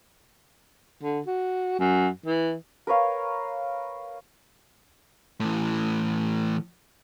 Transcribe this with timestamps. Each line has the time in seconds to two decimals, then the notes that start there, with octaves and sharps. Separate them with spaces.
1.03 D3
1.26 F#4
1.79 F#2
2.26 E3
2.87 A#4 B4 C#5 F5
5.40 A2 E3